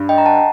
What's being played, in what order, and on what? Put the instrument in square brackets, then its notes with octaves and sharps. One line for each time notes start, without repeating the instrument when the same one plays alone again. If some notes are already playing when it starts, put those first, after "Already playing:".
Already playing: [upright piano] G2 D4
[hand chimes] D#5 G5
A#5
F#5 A5